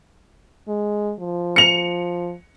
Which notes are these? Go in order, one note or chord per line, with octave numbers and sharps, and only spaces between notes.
G#3
F3
C#7 F7